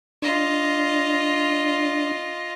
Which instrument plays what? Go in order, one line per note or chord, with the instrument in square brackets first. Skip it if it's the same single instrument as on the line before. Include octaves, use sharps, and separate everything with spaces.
[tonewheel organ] D4 [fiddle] F4 D#5